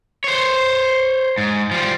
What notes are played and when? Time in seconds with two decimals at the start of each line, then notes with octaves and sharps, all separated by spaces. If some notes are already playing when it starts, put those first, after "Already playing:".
0.24 C5 C#5
1.38 G#2
1.71 F3 G3